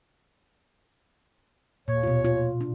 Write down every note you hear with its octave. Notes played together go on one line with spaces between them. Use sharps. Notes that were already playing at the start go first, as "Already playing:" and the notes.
D#2 A#2 C#5
B2 F4
F4
D4